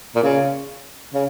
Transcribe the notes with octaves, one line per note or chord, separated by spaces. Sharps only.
A#2
C#3
C#3